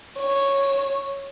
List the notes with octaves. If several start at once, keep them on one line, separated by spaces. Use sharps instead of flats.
C#5